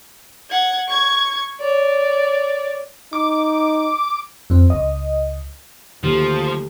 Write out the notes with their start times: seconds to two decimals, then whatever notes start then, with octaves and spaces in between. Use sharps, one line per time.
0.50 F#5 G#6
0.88 C#6 G#6
1.60 C#5 D5
3.13 D#4 D6
4.50 F2 C4
4.70 C#2 D#5
6.04 D2 D#3 F3 A#3 G4